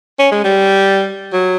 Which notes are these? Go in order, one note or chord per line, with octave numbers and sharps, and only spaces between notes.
C#4
G#3
G3
F#3